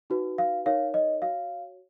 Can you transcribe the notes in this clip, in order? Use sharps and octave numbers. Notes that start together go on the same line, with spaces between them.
D#4 F#4 B4
F5
D#4 A#4 C#5 F5
D#5
F#4 C#5 F5